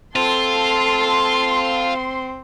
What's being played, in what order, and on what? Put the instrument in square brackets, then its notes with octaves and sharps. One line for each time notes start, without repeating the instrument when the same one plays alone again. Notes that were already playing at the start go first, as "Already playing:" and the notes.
[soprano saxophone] C4 [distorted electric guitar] F4 [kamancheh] A4 A5 [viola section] C6